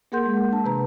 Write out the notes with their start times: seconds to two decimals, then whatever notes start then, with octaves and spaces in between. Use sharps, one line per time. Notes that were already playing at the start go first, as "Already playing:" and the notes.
0.12 A#3 G#4 A#4 F#5 C6 G6
0.26 G#3
0.52 D4 A5
0.64 C3 E3 B4 A#5